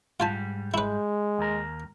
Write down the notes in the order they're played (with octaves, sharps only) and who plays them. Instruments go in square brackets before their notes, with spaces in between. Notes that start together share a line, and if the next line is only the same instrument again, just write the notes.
[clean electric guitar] G#2 G3 [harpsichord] F4 G#5 A5
[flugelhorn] G#3 [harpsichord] E4 B4
[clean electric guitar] D#2 A#4